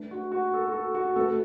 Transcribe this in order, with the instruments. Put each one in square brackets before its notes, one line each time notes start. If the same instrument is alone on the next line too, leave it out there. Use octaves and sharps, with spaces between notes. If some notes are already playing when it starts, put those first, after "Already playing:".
Already playing: [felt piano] A3 D4 B4
[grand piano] F#4
F#4
A4
F#4
A4
F#4
[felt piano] A3 F#4 B4 [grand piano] A4